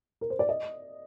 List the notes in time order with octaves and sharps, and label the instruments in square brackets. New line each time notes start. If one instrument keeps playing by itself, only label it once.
[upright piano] A#4
C5
D5
D#5